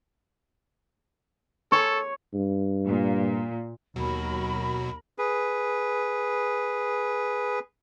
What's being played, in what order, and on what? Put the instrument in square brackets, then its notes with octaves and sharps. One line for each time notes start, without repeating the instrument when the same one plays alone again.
[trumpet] A4 [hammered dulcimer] C#5
[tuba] G2
[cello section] A#2
[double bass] D#2 [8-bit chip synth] B2 F#3 F#4 [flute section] A#4 B5
[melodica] G#4 B4